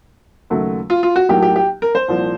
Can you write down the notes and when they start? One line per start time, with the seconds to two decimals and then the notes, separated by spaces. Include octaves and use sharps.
0.50 D#2 C#3 F#3 A3
0.90 F4
1.03 F4
1.16 F#4
1.29 B1 A2 F#3 A#3 G4
1.42 G4
1.56 G4
1.82 A#4
1.95 C5
2.08 C2 A#2 F3